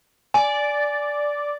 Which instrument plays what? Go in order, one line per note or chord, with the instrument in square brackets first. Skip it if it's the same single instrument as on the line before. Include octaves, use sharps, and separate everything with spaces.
[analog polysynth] D5 [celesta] G#5